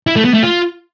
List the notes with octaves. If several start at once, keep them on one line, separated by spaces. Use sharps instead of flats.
E4
A3
B3
A3
F4